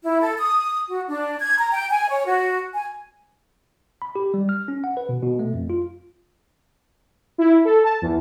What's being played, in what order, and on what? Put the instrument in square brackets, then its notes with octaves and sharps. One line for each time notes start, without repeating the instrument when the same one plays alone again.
[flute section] E4
A4
D#6
F#4
D4
G#6
A#5
G5
G#5
C#5
F#4
G#5
[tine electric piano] B5
G4
G3
F6
C#4
F#5
B4
B2
B2
A3
F2
F4
[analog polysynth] E4
A4
A5
E2